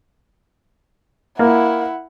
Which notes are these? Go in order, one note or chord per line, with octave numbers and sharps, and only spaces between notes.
A#3 E4 F#5